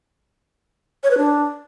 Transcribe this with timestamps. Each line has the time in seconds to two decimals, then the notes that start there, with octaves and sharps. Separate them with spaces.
1.03 C#5
1.11 B4
1.18 D4